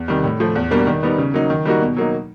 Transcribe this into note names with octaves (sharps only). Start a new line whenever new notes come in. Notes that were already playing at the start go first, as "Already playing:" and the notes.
Already playing: E2
C3 D#3 G3
A2
F3 A3
E2
B2 G3 A#3 D4
D#3
G3 B3 D#4
C#3
F#3 A#3 D#4
D#3
G3 A#3 D#4 F#4
B2
F#3 A#3 D#4